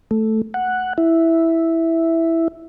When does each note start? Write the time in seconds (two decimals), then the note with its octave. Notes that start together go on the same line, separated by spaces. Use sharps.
0.11 A3
0.54 F#5
0.98 E4